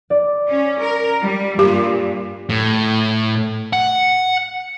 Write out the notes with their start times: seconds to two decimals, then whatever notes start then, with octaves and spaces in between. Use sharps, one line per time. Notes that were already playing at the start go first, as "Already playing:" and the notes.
0.10 D5
0.49 C#4
0.81 A#4
1.22 G3
1.59 G2 A#2 G4
2.50 A2
3.73 F#5